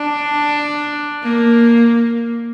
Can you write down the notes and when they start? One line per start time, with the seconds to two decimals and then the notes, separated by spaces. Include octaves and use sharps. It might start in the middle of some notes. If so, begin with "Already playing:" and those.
Already playing: D4
1.23 A#3